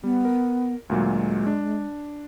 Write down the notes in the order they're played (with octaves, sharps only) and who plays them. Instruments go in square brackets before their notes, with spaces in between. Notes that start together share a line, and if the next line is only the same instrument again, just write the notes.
[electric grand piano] G3 [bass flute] B3
[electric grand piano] A#4
[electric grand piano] D2 A#2 F#3 [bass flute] G#3
[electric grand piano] D4